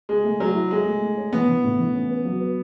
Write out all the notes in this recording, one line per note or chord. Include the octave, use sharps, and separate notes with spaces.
G#3 G#4
A3
F#3 G#4
E4
G#3 A4
A3
A3
C#5
E3 B3
E3
A2
E3
C#4
B4
F#3
B4